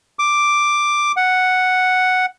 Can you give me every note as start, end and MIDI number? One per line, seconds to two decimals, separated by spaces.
0.19 1.12 86
1.17 2.26 78